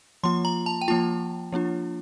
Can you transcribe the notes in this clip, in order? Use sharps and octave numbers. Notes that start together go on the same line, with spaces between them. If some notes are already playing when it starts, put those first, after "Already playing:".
F3 A#3 F4 C6
A#5
A5
G5
F3 A#3 F4 A5
F3 A#3 D4 F4